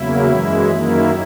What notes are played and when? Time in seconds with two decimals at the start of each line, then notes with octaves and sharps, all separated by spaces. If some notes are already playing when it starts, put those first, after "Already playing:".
Already playing: E2 C#3 F#3 A#3 E4
0.30 F#2 E3 G#3
0.70 F#2 D#3 A#3 E4